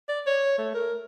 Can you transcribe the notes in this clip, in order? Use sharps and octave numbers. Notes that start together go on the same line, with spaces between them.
D5
C#5
A3
A#4